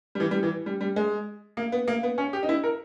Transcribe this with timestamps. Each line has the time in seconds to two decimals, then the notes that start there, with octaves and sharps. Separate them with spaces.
0.15 G3
0.20 E3
0.31 G3
0.43 E3
0.66 G3
0.81 G3
0.96 G#3
1.57 A#3
1.72 B3
1.88 A#3
2.03 B3
2.18 C#4
2.33 G4
2.43 D#4
2.49 E4
2.63 A#4